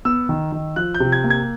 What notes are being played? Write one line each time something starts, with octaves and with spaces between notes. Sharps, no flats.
B3 E6
D#3
D#3
F3 F#6
G6
C3
G#6
A#3
G#6